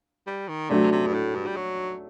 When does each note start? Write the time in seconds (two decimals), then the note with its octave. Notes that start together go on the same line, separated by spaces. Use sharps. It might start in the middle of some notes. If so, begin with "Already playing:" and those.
0.27 G3
0.48 D#3
0.70 C3 F#3 A3 D4
0.92 C3
1.06 G2
1.14 A2
1.35 G2
1.47 G3
1.56 F#3